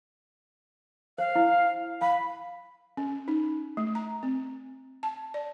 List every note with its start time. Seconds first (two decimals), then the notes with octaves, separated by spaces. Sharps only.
1.18 C5 F5
1.36 E4
2.01 F5 B5
2.97 C#4
3.28 D#4
3.77 A3
3.95 A#5
4.23 C4
5.03 A5
5.34 D5